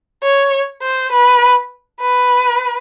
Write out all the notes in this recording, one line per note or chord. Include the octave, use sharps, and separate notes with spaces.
C#5
C5
B4
B4